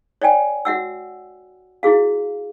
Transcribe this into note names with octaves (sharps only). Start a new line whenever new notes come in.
C#5 D5 G5 G#5
F#4 E5 F#5 E6
E4 F#4 G#4 F5